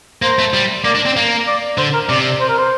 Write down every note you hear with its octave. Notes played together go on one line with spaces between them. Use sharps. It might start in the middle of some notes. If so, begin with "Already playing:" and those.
A#3 C5
A3
G3
A#3 D5
D4
C4
A#3
D5
D3 C5
A#4
C3 D5
C5
A#4
C5